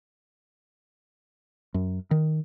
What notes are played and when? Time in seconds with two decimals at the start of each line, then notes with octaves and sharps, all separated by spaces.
1.74 F#2
2.11 D#3